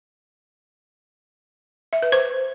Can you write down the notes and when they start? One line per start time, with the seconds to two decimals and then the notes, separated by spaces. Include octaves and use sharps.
1.93 E5
2.02 B4
2.12 C5